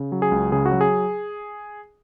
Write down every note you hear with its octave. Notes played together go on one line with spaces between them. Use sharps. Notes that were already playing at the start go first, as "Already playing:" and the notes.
Already playing: C#3
F#3
G#4
C#2
C#3 G#4
F#4
F#3
G#4